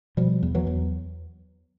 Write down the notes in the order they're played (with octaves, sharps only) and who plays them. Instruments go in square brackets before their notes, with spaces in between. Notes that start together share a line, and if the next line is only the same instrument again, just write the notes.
[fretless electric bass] B2 F3 G3
E2
E3 F#3
E2